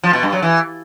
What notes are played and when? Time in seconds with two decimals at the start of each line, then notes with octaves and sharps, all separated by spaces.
0.04 F3
0.13 B2
0.23 G2
0.33 F#3
0.42 E3